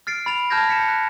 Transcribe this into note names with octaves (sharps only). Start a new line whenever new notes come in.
F6 A6 C7 D7
B5 A6 D7 F7
A5 F6 G6 G#6 A#6
B6 C#7 E7
F#6